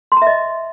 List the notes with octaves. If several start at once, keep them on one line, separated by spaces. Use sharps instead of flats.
C6
A#5
E5
D#5